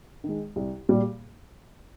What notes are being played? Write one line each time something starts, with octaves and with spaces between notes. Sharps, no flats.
D#3 G#3
C2
A#2 G3